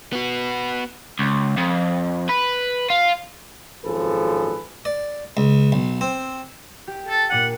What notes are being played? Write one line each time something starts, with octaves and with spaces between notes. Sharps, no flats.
B3 F#4
C#2
F2
B4
F4
G#1 F#2 F3 G#4 A4 B4
D5
C#2
B1
C4
G4
A4 A6
A#2 D4 F#5 D#7